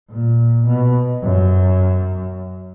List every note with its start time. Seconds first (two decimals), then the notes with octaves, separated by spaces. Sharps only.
0.10 A#2
0.67 B2
1.23 F#2